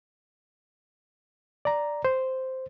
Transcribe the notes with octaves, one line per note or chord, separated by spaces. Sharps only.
D5 A#5
C5